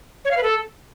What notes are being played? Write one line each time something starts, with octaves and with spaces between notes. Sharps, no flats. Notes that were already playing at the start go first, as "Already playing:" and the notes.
C#5
F5
B4
A4